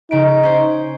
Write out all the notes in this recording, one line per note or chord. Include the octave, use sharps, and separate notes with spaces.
C#3 D#4 D7
C#4 C5